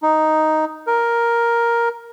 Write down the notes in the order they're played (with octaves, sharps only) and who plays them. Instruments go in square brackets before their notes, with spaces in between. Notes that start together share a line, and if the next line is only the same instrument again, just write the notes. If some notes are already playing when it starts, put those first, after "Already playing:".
[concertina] D#4
A#4